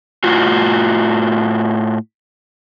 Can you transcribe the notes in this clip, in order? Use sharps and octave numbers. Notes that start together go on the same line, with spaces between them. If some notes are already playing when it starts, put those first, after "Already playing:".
A2 F4 F#4